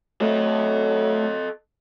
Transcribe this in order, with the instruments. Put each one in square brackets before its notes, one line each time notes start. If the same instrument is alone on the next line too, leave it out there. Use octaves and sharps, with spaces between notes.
[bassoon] F#3 [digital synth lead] A3 [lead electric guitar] A4 D#5